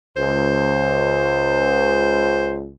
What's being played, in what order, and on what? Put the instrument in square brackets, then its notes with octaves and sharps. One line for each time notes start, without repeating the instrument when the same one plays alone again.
[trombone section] C#2 [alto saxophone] C5